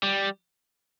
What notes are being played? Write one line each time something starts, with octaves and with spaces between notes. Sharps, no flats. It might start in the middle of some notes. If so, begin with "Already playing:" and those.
G3